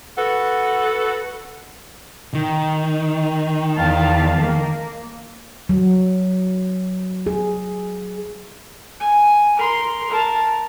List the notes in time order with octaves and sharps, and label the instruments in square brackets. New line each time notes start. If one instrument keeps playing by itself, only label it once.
[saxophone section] F#4 A4 B4 F#5
[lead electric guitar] D#3
[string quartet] E2 F5 A5
A#3
[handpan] F#3
G#4
[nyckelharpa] G#5
A#4 C6
A#4 A5